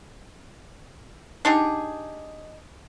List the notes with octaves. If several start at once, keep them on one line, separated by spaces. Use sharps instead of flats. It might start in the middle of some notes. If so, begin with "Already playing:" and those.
D4 D#4 G4 G#4